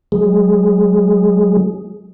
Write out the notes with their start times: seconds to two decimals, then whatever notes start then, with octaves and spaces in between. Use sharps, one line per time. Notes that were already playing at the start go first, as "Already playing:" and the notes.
0.12 F#3 G#3 G#4